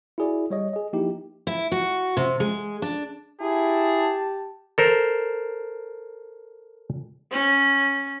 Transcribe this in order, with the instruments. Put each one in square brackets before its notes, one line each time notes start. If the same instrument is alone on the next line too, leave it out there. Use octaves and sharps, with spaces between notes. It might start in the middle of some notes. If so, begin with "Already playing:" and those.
[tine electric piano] E4 F#4 G#4 D5
G3 C#5 D#5
G#4 D#5
F3 A#3 D#4 E4 G4
[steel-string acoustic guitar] E4
F#4
C3
G#3
D4
[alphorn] E4 [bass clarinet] G4 [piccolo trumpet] G#4 [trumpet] A5
[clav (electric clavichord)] A4 A#4 C5
[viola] C#4